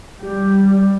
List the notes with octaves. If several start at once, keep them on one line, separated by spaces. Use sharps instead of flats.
G3 G4